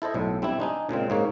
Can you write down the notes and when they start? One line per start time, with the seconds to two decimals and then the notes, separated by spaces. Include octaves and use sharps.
0.02 E4 A4 C5 D#5
0.14 B1 A2
0.42 G3 C4 D4 E4
0.60 D4 D#4 G#5
0.89 A#2 C#3 G#3 C4
1.10 G#2 A#3 C#5